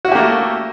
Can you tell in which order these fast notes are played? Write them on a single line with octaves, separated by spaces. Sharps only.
F#4 E4 G4 A#3 A3